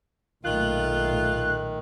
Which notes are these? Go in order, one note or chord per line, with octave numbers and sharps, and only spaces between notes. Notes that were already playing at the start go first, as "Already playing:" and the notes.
B1 A#2 D#3 A3 F4 F#6